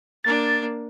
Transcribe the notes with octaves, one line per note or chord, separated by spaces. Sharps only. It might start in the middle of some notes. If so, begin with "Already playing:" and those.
A#3 D4 A6